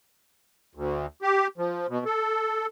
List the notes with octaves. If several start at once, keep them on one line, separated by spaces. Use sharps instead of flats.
D2
G4
F3
B2
A4